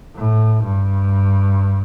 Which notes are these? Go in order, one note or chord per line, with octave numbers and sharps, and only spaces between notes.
A2
G2